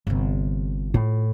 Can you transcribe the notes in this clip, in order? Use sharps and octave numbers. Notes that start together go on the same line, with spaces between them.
G1 C3
A2 F4